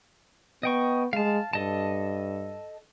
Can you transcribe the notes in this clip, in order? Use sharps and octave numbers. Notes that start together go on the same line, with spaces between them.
B3 D#5 G5 C#6
G#3 F5 A5
G2 A4 D#5 A5